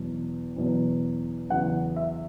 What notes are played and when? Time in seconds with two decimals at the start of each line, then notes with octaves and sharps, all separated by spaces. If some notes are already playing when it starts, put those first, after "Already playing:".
Already playing: E2 B2 F#3
0.56 E2 B2 F#3
1.50 E2 C#3 F#3 F#5
1.96 E5